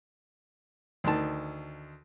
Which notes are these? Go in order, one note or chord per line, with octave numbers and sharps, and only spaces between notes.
D2 D#3 A5